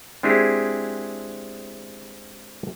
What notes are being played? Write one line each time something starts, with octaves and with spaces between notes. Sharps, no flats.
G#3 C4 D4 E4 G4 G#4